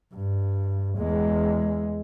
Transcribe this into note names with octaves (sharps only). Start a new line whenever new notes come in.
G2
E2 G#3